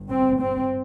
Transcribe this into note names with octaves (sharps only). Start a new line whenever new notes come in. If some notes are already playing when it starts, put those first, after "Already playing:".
Already playing: G1 G2
C4
C4